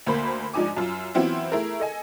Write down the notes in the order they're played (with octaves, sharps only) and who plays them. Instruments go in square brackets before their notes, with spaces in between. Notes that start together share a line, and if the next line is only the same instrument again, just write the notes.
[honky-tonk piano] D2 A#3 C5 B5
G#2 F3 D4 D#4 G#5 D6
F#2 F4
E3 F#3 B3 C4 E4 F4
A3 E4 G#4 A#4
A4 D#5 G#5